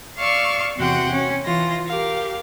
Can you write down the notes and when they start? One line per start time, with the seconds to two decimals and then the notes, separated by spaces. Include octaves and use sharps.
0.19 D5 F5 C#6 E6 F6
0.78 E2 C3 F#4 F#5 G5 C6
1.11 C#4
1.44 E3 F4 A#6
1.86 G4 A#4 F5